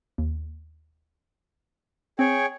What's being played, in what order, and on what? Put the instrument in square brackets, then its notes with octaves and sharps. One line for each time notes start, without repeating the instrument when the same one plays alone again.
[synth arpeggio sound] D#2
[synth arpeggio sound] C4 [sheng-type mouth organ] G#4 C#5 G5